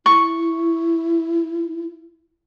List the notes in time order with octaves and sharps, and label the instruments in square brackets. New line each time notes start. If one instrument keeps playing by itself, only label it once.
[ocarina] E4 [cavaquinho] C#6